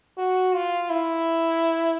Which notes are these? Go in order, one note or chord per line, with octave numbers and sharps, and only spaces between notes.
F#4
F4
E4